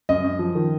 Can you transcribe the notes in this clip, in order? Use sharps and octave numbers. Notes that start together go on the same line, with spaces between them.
F#2 D#5
F#2
F3
D#3